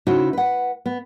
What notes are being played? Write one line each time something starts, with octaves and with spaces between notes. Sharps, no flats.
C#3 D#4 E4 F#4 C5
B4 F#5
B3